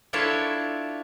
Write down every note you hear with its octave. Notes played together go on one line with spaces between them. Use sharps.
D4 E4 F4 A4 C#5 A5